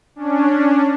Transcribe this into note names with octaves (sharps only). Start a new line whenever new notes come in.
C#4 D4